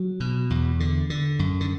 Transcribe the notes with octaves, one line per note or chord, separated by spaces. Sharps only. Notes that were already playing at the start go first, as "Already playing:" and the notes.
Already playing: F#3
B2
E2
D3
D3
F#2
D3